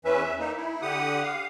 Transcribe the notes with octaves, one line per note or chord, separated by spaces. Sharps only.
E2 E3 C#4 B4 E5
E5
A#3 D#4
E4
D3 G4 F#5 D#6
F5